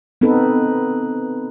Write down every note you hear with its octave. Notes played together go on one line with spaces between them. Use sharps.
B3 C4 D#4 A4 B4